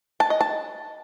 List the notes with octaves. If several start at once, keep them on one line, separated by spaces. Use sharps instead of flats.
A5
D#5
A5